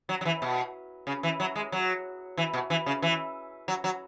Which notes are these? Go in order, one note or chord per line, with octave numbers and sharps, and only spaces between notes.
F#3
F#3
E3
B2
C#3
E3
F#3
G#3
F#3
E3
B2
E3
C#3
E3
F#3
F#3